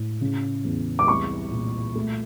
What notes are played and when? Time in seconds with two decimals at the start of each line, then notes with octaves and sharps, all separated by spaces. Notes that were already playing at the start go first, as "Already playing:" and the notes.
Already playing: A2
0.21 C#3
0.64 E2
0.99 D6
1.08 C2 C#6
1.52 A#2
1.95 A3